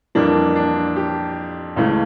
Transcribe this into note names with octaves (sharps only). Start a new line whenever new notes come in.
F2 E3 G3 A#3 D4
D4
G4
C#2 C#3 E3 A3